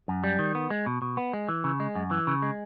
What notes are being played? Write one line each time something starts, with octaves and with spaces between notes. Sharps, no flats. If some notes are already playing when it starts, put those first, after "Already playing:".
F#2
G3
D#3
B3
G#3
B2
B2
B3
G#3
E3
C#3
G#3
F#2
E3
C#3
G#3